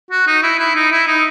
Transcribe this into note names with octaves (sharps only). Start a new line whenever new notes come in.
F#4
D#4
E4
E4
D#4
E4
D#4